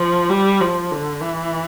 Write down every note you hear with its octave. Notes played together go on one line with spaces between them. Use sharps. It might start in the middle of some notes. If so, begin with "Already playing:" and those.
Already playing: F3
G3
F3
D3
E3